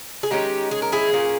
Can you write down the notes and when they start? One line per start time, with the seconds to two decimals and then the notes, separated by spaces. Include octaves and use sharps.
0.23 G#4
0.31 D#3 G#3 C#4 D#4 G4
0.71 G#4
0.82 A#4
0.92 E4 G#4
1.12 A#2 A#3 C#4